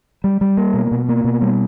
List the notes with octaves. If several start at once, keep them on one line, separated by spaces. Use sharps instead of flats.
G3
G3
A#3
B2
B2
A#3
B2
G3